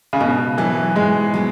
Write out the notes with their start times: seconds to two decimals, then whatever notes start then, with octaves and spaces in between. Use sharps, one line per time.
0.13 C#3
0.20 G#2 B2
0.58 E3 F#3 B3 E4
0.96 G#2 G#3
1.34 F#3 B3